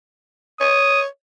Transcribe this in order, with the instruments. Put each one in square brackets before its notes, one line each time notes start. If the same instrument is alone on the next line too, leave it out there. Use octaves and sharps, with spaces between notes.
[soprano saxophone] C#5 [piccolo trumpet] D#6